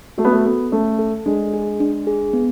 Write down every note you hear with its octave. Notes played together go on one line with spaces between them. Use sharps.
A3 F#4
B3
A3
B3 A4
A3 C#4
A4
G#3 D4
G#4
D4
G#4
B3